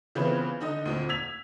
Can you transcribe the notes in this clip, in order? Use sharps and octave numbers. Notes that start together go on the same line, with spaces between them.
C#3 E3 B3 C4 F4 B4
D3 D#4 D#5
D2 A#2 C4
E6 G#6 B6 F7